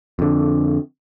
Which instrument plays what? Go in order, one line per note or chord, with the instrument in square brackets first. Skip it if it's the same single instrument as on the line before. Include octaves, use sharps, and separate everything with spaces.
[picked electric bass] F2 D3